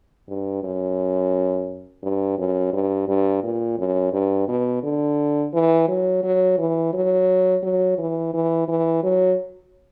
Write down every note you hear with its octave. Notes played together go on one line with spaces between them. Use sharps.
G2
F#2
G2
F#2
G2
G2
A#2
F#2
G2
B2
D3
E3
F#3
F#3
E3
F#3
F#3
E3
E3
E3
F#3